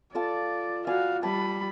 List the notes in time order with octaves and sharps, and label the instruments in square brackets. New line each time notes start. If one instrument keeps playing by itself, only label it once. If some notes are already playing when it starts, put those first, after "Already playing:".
[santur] F4 A4 A5 [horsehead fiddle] D5
[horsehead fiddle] F#4 F5 [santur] D5 G#5 B5
[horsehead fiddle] G3 B5 [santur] A5 D#6